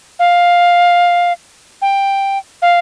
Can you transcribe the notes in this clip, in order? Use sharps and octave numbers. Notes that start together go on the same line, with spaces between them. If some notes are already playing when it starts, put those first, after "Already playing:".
F5
G5
F5